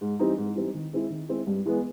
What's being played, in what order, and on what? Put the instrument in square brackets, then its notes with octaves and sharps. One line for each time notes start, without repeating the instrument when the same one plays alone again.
[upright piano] G#2
E3 G3 C4 D#4
G#2
E3 G3 C4 D#4
D#3
G#3 C4 E4
D#3
G#3 C4 E4
G2
E3 G#3 B3